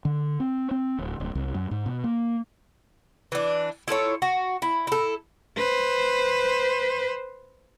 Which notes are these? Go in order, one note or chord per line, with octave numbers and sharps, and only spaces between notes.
D3
C4
C4
D1
D1
C2
F#2
G#2
B2
A#3
E3 D4
E4 F4 A4 C#5
F#4
E4
E4 A4
B4 C5